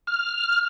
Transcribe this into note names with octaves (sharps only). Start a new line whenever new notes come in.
F6